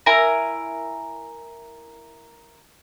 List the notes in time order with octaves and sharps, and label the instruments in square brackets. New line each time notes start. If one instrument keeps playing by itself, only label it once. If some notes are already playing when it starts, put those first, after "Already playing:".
[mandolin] E4 A#4 G#5 A#5